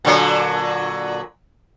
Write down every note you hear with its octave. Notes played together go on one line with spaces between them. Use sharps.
A#2 D3 F#3